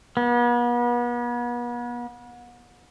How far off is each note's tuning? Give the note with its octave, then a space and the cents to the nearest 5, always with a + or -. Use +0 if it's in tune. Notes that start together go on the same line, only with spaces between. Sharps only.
B3 -40